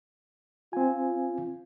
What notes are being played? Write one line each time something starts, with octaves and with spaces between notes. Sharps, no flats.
C4 F4 G#5